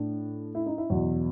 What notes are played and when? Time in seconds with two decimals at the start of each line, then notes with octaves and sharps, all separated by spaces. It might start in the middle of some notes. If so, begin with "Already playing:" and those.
Already playing: A2 D4
0.55 E4
0.66 D#4
0.78 E4
0.90 E2 B2 F#3